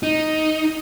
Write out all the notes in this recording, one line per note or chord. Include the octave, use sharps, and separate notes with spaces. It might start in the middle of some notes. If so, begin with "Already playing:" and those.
D#4